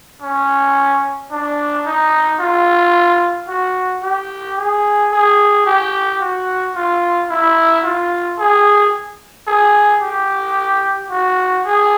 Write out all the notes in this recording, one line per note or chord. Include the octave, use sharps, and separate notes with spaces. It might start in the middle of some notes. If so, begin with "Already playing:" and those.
C#4
D4
D#4
F4
F#4
G4
G#4
G#4
G4
F#4
F4
E4
F4
G#4
G#4
G4
F#4
G#4